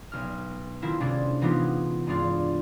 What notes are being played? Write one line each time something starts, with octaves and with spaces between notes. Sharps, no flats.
B1 F6
D#3 C4 E4 F4 A#4
C3 G#3 C#4 D4 E4 F4
E3 G#3 B3 D#4 F4 G4
G2 G#3 C4 D4 E4 F4